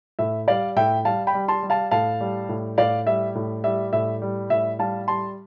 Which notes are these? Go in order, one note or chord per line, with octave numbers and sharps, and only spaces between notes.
A2 E5
G3 D5 F5
A2 E5 G5
G3 F5 A5
G5 B5
G3
A5 C6
G3
F5 A5
A2 F5 A5
G3
A2
A2 D5 F5
G3 E5
A2
G3 E5
A2 E5
G3
A2 E5
G3 F5 A5
G3 A5 C6